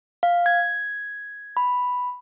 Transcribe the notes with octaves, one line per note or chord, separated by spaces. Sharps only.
F5
G#6
B5